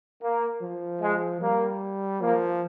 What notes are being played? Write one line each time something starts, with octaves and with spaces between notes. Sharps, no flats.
A#3
F3
G#3
G3 A#3
F3 A#3